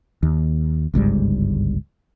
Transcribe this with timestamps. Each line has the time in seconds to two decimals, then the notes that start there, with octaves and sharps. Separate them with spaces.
0.23 D#2
0.94 G1 C#2 G#2 G3